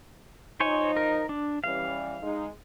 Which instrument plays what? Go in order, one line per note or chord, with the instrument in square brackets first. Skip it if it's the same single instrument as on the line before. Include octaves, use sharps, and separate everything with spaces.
[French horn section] F3 D#4 [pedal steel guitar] C5 C#5 G#5
[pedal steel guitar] A#4
D4
[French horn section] E3 G3 C#4 [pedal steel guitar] F5
[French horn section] G#3 D#4